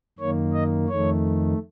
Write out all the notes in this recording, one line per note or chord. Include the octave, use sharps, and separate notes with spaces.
F#2 D#3 A#3 C#5
D#5
F2 D#3 A3 C#5